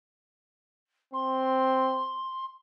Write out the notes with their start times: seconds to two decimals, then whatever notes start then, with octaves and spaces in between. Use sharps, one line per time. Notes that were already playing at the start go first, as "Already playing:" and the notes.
1.14 C4 C6